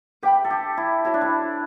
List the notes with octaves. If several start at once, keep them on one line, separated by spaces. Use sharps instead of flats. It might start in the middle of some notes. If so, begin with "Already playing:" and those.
G4 B4 E5 G5 B5
A4
G4
E4
E4 F#4 C#5 G5
D4
E4